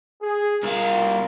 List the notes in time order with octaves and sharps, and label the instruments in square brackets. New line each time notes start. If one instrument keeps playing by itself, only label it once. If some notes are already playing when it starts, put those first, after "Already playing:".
[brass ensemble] G#4
[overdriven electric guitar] C2 F5 [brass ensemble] F4 A#4